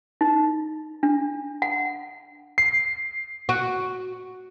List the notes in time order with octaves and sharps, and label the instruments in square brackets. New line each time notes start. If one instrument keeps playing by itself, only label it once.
[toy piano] D#4
D4
F#5
[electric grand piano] C7
[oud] F#4